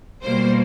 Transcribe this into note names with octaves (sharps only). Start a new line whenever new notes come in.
B2 G3 A#3 C5